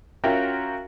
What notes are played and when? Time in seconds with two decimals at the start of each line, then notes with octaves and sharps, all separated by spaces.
0.24 C#4 F4 F#4 A#4 E5 G5